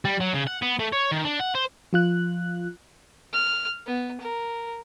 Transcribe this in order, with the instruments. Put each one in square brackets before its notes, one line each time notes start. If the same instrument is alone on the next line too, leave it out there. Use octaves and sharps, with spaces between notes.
[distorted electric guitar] G3
F#3
C#3
F#5
B3
A3
C#5
D#3
D4
F#5
C5
[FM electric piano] F3 F4 F#6
[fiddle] F6
B3
A#4